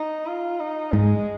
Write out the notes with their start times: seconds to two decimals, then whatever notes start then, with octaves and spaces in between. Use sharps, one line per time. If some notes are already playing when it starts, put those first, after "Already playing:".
Already playing: D#4
0.27 F4
0.60 D#4
0.93 G#2 G#3